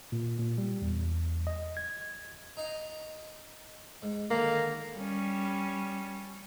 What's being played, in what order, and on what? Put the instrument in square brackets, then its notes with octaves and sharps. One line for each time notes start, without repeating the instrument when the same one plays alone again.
[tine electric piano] A#2
A#2
G3
E2
D#5
G#6
[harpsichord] D#4 D#5 F5
G#2
[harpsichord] D3 D#3 [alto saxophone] A#3
[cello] G3 C#4